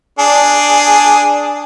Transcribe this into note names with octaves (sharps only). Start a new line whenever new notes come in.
D4 G#4